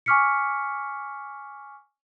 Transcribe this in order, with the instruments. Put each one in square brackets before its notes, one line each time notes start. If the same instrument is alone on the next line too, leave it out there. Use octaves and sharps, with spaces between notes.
[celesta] G#5 C#6 D6 F6 B6 C#7